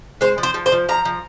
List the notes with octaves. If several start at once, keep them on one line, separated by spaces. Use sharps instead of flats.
G#3 C5
F3
C5
F3
C5
F3
F3 A#5
F3